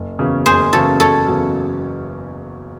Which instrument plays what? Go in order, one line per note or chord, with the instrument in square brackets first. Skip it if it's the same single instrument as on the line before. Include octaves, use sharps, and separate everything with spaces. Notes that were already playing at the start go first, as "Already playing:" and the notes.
Already playing: [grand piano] F#1
E2 C#3 F#3 C#4
[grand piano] F#1 [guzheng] G#4 C5
[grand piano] E2 C#3 F#3 C#4 [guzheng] A4 C#5
[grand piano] F#1 [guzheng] A4 C#5
[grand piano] E2 C#3 F#3 C#4